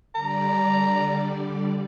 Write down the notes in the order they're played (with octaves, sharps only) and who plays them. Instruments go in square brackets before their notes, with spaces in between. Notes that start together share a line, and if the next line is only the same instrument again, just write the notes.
[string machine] D3 G3 D5 [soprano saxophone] A#5